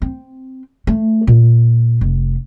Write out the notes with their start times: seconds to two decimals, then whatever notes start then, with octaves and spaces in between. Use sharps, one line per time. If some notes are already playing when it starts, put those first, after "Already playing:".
0.02 C4
0.87 A3
1.27 A#2
2.01 F1